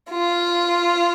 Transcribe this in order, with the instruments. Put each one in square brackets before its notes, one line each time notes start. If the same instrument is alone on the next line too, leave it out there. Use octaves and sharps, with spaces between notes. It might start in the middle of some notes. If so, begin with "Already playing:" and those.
[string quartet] F4